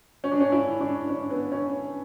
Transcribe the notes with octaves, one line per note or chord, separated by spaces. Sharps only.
C#4
D4
C#4
E4
D4
C#4
B3
C#4